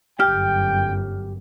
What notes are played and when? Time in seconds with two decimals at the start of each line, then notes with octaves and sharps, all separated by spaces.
0.20 G1 F#2 G4 G5 F6